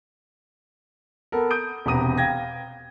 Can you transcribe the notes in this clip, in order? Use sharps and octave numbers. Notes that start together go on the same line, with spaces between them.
B3 A4 A#4
D#6 G6 D7
E1 C3 B3 A#5 D#6 D#7
F5 G5 G#6 A#6